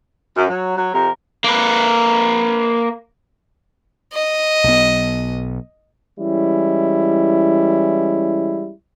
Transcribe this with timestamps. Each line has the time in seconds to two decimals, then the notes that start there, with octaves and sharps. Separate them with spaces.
0.36 F#2
0.48 F#3
0.77 F#3
0.93 F2 C3 A#4
1.44 A#3 B4
4.14 D#5
4.64 B1 B3
6.19 E3 G3 G#3 C#4 E4